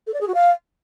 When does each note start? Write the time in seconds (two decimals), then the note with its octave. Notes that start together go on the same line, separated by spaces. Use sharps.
0.07 A4
0.14 D5
0.20 G#4
0.27 F#4
0.34 F5